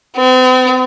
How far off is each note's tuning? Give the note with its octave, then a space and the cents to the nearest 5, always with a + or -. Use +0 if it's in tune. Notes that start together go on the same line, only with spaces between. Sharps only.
C4 -40